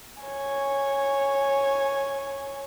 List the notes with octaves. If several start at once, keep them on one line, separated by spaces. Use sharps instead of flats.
C#5 G#5